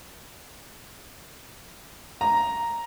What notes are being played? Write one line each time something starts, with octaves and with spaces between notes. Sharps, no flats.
A#5